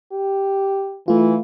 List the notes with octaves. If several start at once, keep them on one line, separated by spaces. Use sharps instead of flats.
G4
E3 A3 F4